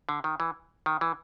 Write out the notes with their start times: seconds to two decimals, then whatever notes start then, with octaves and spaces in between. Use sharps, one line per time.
0.09 D3
0.24 D#3
0.40 E3
0.86 D#3
1.01 E3